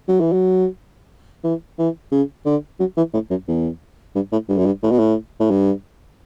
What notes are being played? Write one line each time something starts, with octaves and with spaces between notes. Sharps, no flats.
F#3
E3
F#3
E3
E3
C#3
D3
F#3
E3
A2
F#2
E2
G2
A2
G2
F#2
G2
A2
B2
A2
A2
G2